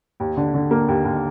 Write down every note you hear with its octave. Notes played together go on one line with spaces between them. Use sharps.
D#2
D3
D3
A#3
D#2
D#2